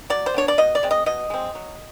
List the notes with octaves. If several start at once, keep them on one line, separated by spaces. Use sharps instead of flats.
F#3 D5
C5
B3 D4 C#5
D5
B2 D#5
D5
G#3 C4
D#5
B2 D#5
G#3 C4
F#3